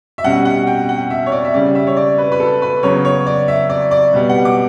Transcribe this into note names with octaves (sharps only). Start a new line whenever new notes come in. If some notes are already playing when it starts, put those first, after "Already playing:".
E5
B2 G3 C#4 F#5
F#5
G5
F#5
E5
C#5
D5
E5
C#3 G3 C#4 D5
E5
C#5
D5
B4
B4
A4
B4
C#3 F#3 B3 C#5
C#5
D5
E5
D5
D5
B2 G3 B3
F#5
D6